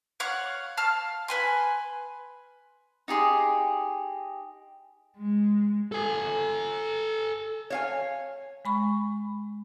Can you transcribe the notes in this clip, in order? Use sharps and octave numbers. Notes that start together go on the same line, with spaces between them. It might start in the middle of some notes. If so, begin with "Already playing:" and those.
C#5 F5 F#5 C#6
F5 A5 F6
B4 G#5 C6
D#4 G4 G#4 C6
G#3
A4 G#5
C#5 F5 G#5
G#3 B5 C#6